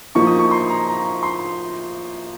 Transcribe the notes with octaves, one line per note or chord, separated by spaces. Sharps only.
A#2 F3 A#3 D#4 C#6
D#6
C#6
C6
A#5
A#5
C6